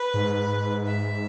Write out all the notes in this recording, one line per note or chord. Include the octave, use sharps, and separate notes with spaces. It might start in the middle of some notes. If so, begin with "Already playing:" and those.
Already playing: B4
G#2
E5